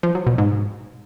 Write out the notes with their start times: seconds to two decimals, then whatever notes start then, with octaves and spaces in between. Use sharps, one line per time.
0.03 F3
0.15 F#3
0.27 B2
0.38 G#2